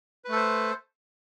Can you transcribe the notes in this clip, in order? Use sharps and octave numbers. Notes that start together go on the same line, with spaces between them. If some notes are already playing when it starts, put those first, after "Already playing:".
A3 A4 B4 C5